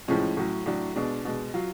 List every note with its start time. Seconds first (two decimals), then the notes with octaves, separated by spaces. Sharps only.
0.08 A2 F3 G#3 C#4
0.37 A2 F#3
0.66 A2 F#3 D4
0.96 B2 G#3 D4
1.25 B2 G#3
1.54 F#3 F4